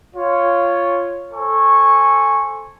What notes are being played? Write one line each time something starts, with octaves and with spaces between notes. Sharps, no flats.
F4 C#5
A4 C5 G#5 C#6